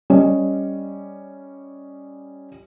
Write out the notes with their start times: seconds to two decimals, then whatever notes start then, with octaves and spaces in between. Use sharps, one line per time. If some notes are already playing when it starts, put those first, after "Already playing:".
0.10 G3 C#4 D#5